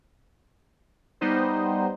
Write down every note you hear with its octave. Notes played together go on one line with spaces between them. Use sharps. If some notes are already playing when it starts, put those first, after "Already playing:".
G3 B3 D#4 C5